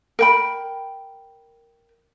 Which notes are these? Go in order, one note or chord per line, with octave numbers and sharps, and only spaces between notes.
A#4 G5 B5